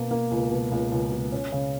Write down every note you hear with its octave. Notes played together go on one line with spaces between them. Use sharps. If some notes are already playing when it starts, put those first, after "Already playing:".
Already playing: B2 A#3
A#3
C#2
B2
C#2
C#2
B2
C#4
C#3